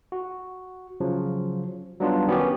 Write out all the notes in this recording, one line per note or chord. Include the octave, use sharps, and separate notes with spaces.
F#4
C#3 F3 F#3
F#3 G3 B3 D4 D#4 F4
D#3 B3 C#4 F#4 G4